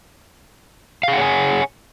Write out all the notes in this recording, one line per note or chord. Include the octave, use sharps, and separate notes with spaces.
G#4 C#5 F5 F#5 G#5